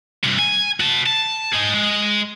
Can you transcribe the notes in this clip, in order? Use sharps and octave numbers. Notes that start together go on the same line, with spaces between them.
G2 C3
G#5
F#4 A5
A5
D#4 G#4
G#3